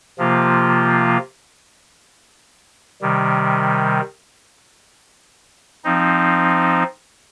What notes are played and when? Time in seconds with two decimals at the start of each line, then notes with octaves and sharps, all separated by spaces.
0.18 C3 F3 A#3 F4
3.01 C3 D#3 G3
5.84 F3 C4 D#4